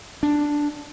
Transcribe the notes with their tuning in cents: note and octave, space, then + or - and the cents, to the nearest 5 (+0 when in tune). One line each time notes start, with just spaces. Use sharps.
D4 +0